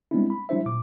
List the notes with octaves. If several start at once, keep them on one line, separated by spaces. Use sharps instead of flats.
G3 G#3 B3 C4 D4 E4
B5
F#3 G3 D4 E4 C5 E5
A#2 D6